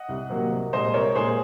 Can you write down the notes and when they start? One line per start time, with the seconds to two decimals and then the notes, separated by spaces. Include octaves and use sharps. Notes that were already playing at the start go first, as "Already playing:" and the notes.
Already playing: D#5 F#5
0.09 C2
0.30 C3 F#3 A#3
0.52 C2
0.73 A#2 G#3 C5 D#5
0.94 C2 A#4 C#5
1.15 A#2 G#3 G#4 C5